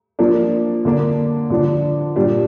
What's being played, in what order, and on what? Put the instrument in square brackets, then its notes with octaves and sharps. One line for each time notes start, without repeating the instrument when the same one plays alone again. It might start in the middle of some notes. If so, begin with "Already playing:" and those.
[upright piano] F3 A#3 D4
D3 A#3 D4
D3 F3 D4
A#2 G3 D4